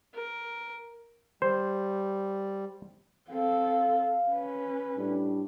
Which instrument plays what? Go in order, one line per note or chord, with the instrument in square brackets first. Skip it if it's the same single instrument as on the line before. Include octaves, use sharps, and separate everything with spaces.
[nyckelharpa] A#4
[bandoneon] G3 [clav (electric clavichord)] C5
[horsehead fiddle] C4 A4 [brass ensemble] F5
[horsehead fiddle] C#4 B4
[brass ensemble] A2 G3 D4